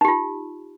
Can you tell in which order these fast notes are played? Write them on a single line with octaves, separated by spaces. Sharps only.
D#4 G4 F4